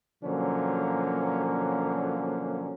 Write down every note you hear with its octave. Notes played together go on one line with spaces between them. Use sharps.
B2 D3 F3 F#3 A#3 C#4